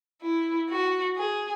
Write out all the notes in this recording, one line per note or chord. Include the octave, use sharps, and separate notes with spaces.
E4
F#4
G#4